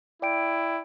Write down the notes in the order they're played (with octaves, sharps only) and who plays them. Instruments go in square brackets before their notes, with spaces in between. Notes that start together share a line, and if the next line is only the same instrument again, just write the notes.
[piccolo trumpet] E4 [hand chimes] D5 G5 D7